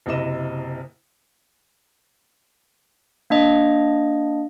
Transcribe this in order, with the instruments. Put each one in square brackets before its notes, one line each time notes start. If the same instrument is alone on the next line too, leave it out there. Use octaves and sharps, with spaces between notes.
[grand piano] F#1 C3 E4 D#5 E7
[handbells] A#3 D4 D#5